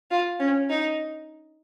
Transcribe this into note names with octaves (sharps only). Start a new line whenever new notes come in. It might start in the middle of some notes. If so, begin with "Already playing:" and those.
F4
C#4
D#4